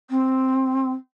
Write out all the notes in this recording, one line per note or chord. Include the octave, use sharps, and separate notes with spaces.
C4